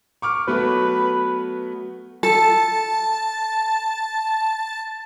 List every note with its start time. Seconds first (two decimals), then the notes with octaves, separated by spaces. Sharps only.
0.22 C#6 D6 F6
0.48 F#3 A3 B3 B4
2.23 A4 A5